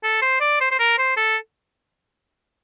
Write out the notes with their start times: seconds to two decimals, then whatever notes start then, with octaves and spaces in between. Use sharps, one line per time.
0.03 A4
0.22 C5
0.41 D5
0.60 C5
0.71 C5
0.79 A#4
0.98 C5
1.17 A4